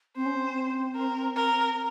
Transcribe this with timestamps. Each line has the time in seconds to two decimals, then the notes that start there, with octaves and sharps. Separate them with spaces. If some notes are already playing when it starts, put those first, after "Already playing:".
0.16 C4 C5
0.26 C#4
0.36 C4
0.96 A#4
1.36 A#4